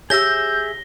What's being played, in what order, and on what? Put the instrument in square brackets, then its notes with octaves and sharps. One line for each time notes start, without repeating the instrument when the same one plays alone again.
[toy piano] G4 C#5 [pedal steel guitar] G#4 E5 E6 [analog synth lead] G6 [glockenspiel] A#6 G7